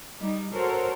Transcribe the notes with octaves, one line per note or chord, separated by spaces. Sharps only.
G3 D#4
F#4 A4 A#4 C5 C#5